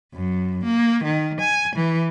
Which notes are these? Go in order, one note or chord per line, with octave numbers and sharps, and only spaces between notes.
F#2
A#3
D#3
G#5
E3